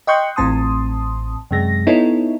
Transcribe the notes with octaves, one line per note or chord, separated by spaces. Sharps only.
D#5 G5 C6 C#6 F#6 G6
A1 A2 C4 A5 C6 D#6
F#2 C3 G#3 A#6
B3 D#4 E4 A4 C#5